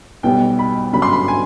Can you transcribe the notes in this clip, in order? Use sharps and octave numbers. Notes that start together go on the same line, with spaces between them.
B1 B2 G3 B3 G5
B5
G1 F#2 D3 F#3 B5
C6
B5
G#5